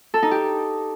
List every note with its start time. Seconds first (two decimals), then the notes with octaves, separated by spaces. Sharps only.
0.14 A4
0.23 D#4
0.31 G4